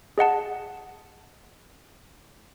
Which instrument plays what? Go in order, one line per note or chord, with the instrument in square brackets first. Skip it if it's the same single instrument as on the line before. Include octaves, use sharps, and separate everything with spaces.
[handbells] G#4 D#5 F#5 A5